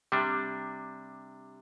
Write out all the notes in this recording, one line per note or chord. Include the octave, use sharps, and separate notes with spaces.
C3 G3 D4